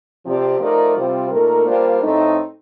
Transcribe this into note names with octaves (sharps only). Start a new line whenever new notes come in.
C3 F3 C4 G4 D5
F3 A3 D#4 A#4 D5
C3 G3 C4 F4 C5
A#2 A3 D#4 A#4
G3 A#3 D4 F4 C5
A2 A3 C4 D#4